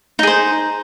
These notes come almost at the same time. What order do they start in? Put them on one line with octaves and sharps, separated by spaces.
D#4 G#4 C5